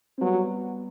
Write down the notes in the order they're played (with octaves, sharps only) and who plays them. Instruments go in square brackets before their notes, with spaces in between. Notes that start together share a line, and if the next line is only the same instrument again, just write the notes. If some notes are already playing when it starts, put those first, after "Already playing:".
[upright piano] C4
[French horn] F#3 [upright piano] G3 B3